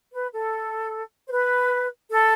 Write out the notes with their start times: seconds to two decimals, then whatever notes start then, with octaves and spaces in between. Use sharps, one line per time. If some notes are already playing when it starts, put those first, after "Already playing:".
0.13 B4
0.33 A4
1.27 C5
1.32 B4
2.10 A4